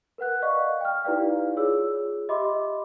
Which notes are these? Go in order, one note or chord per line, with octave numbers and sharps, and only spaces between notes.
A#4 B4 F#5 F#6
D5 D#5 F5 C#6
G5 F6
D#4 E4 G4 B4 D5 F5
F4 G#4 C#5 E6
G4 D#5 E5 B5 C6 D6